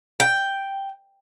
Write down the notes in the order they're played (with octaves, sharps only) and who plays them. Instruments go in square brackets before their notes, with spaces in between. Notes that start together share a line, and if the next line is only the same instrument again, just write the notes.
[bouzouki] G5